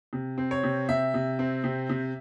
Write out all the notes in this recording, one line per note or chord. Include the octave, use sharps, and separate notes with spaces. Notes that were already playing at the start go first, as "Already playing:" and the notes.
C3
C4
C#5
C3
C3 E5
C3
C4
C3
C3